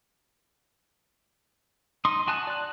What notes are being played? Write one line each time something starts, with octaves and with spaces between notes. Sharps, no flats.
D#4 C6 D#6
F#4 G#5 A5 F#6
D5 F#6